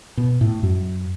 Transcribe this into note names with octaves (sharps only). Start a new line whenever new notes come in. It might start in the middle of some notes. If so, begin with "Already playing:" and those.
B2
A2
F#2